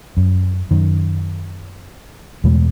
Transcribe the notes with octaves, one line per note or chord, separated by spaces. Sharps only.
F#2
F#2 D#3
E2 B2 G#3 A3